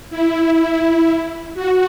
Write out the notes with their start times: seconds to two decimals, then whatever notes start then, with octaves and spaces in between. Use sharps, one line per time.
0.10 E4
1.55 F#4